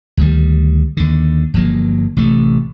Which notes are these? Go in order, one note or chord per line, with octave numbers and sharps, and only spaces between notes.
D2 D#3 G3
D#2 D3
G1 F3 F#3 A#3
A1 C3 A3